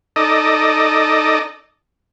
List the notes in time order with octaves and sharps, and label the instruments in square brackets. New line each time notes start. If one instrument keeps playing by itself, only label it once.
[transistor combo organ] D#4 A4 D5 D#5